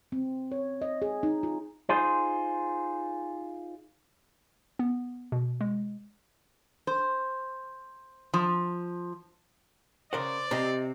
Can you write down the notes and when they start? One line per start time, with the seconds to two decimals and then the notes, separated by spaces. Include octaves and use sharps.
0.12 C4
0.52 C#5
0.82 D#5
1.02 G#4
1.23 D#4
1.43 F4
1.89 D#4 F4 G#4 C5
4.79 B3
5.32 B2
5.61 G#3
6.87 C5
8.34 F3
10.13 C#3 A#4 C5 D5 F#5
10.51 C3 C4 D#5 G5 A#5